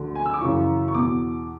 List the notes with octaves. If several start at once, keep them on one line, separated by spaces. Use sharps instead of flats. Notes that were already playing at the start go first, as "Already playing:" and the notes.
Already playing: D2 D3
G#5
E6
D6
F#2 C#3 E3 C#6
C#6
E2 B2 D6